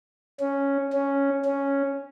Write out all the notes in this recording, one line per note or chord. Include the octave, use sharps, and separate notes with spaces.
C#4
C#4
C#4